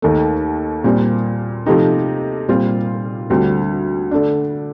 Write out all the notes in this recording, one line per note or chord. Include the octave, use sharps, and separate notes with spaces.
D#2 D#3 A3
A#2 G3 C4
C3 F3 A3 D#4 G4
A#2 G3 C4 F4
D2 D3 G3 C4
D3 A3 D4